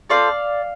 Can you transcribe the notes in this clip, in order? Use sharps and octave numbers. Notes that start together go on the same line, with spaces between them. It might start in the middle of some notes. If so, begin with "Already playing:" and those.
C4 F4 A4 D5 F5